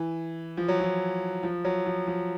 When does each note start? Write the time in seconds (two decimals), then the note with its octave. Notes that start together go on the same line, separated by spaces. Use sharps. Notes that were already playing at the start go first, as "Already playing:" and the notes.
Already playing: E3
0.57 F3
0.68 F#3
0.80 F3
1.43 F3
1.65 F#3
1.86 F3
2.07 F3